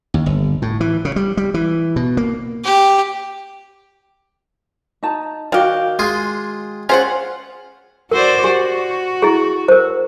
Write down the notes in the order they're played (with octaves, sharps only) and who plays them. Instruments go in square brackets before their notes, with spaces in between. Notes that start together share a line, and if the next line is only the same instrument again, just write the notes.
[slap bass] D#2
G1
A2
E3
C#3
G3
G3
E3
B2
A#3
[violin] G4
[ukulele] D#4 A5 A#5
[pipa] D#3 G4 [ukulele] F#4 F5
[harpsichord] G#3 F4 G#4
[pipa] C#4 C5 F#5 [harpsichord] F4 [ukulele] G#4
[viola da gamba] F#4 C5 D5 [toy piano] A#4
[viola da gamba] F#4 [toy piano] G4
[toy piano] E4 G#4
A#4 C5